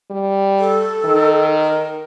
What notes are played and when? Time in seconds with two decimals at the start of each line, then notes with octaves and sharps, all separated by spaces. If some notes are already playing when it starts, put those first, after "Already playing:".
0.11 G3
0.59 A4
1.05 D#3
1.61 A#4